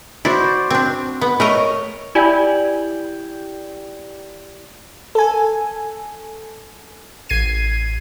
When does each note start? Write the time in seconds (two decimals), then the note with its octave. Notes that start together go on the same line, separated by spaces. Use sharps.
0.25 E4 F#4 C5 D5
0.70 C4 D4
1.21 B3
1.40 A3 A#4 C#5 D#5
2.15 E4 G4 D5 G#5
5.15 A4 G#5
7.29 A1 G#6 C7 D#7